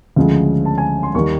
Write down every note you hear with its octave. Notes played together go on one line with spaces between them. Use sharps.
D2 C#3 F3 G#3
A5
G#5
C6
D#2 D#3 G3 C#6